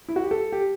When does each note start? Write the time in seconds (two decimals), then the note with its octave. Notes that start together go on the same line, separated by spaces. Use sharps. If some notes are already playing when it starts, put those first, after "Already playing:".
0.08 E4
0.16 F#4
0.24 G4
0.31 A4
0.52 G4